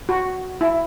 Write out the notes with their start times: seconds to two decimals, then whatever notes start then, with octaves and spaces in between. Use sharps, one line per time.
0.09 F#4
0.61 E4